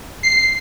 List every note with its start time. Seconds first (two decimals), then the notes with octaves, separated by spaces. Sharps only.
0.23 C7